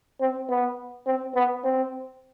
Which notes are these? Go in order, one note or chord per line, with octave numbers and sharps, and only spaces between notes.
C4
B3
C4
B3
C4